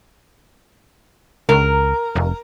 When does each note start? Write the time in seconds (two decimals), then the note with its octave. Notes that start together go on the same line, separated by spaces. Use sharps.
1.49 C#2 A#4
2.16 F1